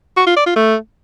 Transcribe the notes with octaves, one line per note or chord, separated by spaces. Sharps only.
F#4
F4
D5
F4
A3